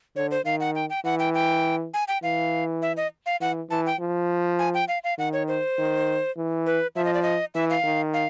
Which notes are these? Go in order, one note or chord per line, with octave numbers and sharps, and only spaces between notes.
D3 C#5
C5
D#3 F5
F#5
G5
G5
E3 F#5
G5
G5
G#5
G5
E3 F5
E5
D#5
F5
E3 F#5
E3 A5
G5
F3
G#5
G5
F5
F5
D#3 F#5
C#5
C5
D#3
E3
B4
F3 E5
D#5
D5
D#5
E3 E5
F5
D#3
F5